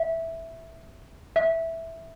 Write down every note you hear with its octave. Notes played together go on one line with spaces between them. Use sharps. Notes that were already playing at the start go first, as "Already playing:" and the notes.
Already playing: E5
E5